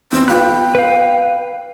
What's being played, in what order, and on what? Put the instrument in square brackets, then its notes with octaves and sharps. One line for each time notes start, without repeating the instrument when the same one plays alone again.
[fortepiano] E2 [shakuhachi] C4
[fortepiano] B1 F4 B5 [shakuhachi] G5 [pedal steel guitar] F#6
[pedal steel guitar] B4 F5